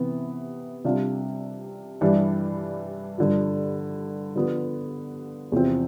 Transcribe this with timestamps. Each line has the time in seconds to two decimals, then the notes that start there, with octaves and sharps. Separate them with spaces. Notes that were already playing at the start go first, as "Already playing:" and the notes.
Already playing: C3 E3 B3
0.85 C3 G3 D4 F4
2.01 G2 E3 G3 D4
3.18 G2 D3 F3
4.36 D3 F3 B3
5.52 E2 C3 F3 C4